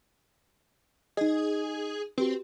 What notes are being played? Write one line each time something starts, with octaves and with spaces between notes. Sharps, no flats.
D#4 G#4 D#5
C4 F#4 G4 B4